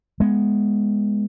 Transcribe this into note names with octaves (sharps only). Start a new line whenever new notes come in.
G#3 B3